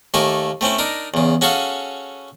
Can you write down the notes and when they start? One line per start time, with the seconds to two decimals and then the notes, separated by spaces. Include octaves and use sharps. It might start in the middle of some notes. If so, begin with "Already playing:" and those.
0.14 D#2 A3 A#3 A4 G#5 D6
0.61 A3 C4 C#4 E4
0.78 D4 D#4 A#4
1.14 E2 C#3
1.41 C#4 F#4 G#4 A4 C#5 F5